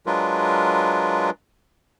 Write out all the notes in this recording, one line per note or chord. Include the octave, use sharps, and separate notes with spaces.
F#3 G#3 D4 F4 A#4 B4